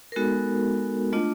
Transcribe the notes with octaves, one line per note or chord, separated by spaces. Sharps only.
A#4
G#3 B3 D#4 F#4 A4
A3 D4 F4 D#5